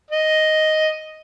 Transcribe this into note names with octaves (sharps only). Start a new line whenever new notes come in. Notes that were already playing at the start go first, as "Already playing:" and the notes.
D#5